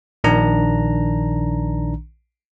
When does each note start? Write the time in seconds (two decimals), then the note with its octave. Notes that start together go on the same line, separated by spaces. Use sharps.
0.24 A#1 D#3 D4 A#5